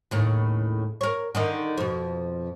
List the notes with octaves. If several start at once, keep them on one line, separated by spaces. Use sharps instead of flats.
D#2 A2 C#3
A#4 C#5
D3 D#3 D#4
F2 B2